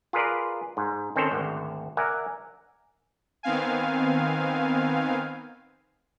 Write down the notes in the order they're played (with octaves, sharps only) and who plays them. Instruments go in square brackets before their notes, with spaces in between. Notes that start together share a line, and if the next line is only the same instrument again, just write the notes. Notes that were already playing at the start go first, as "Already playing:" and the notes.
[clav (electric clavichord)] F4 G#4 A#4 B4 D5
G#2
D#3 C4 C#4 A4 C5 C#5
G#1 D2
A#4 D5 E5 F#5 G#5
[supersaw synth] D#3 B3 C4 F5 G#5